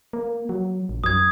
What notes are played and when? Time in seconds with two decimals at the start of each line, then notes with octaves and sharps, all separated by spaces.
0.13 A#3
0.49 F#3
0.89 A#1
1.04 F#2 D#6 G#6